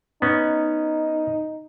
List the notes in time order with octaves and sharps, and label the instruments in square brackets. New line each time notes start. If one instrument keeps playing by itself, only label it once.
[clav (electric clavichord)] B3 C#4 [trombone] D#4